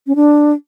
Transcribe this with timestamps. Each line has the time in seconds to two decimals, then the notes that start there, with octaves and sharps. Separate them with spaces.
0.07 C#4
0.16 D4